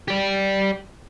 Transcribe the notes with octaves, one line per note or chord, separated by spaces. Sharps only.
G4 D5